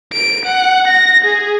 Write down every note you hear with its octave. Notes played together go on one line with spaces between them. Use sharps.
D7
F#5
A#6
G#4